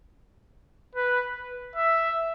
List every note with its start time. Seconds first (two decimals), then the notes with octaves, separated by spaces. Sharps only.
0.95 B4
1.76 E5